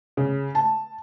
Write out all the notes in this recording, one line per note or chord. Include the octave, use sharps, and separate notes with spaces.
C#3
A5